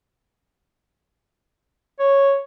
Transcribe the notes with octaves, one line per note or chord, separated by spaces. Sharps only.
C#5